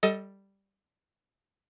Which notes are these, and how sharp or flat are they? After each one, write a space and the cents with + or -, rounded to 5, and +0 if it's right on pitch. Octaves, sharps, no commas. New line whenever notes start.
G3 +0 A4 +10 D#5 +25